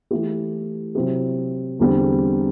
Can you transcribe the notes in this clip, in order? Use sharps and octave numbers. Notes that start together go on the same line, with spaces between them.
E3 A3 E4 G4
C3 F#3 C4 E4 G4
E2 D3 G3 C4